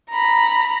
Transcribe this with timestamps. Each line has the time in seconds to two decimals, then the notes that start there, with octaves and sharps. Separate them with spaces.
0.10 A#5 B5